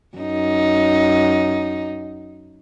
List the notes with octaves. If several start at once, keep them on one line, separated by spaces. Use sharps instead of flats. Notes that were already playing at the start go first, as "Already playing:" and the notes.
F#2 D#4